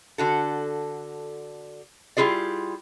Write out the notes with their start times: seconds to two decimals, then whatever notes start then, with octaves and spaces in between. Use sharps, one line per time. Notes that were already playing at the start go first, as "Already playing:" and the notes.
0.18 D3 F#4 A4
2.17 G3 E4 F4 G#4 D5